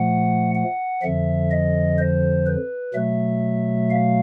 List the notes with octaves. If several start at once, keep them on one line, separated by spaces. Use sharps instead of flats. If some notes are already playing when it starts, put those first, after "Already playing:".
Already playing: A#2 F3 A3 F#5
F#5
F2 D3 F3 E5
D#5
C5
B4
B2 F#3 A3 E5
F5